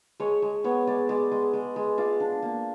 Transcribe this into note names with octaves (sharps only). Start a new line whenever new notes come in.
G#3 C#5
G#3
B3 C#5
G#3 D5
G#3 D5
G#3
G#3
G#3
F4 D5
D4
A#3